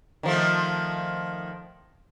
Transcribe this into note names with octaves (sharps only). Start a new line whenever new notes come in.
D#3 F3 A3